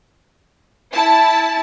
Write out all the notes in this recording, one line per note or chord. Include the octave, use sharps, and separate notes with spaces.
E4 A5